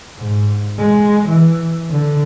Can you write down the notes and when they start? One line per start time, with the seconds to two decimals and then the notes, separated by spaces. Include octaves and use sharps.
0.17 G#2
0.78 G#3
1.29 E3
1.90 D3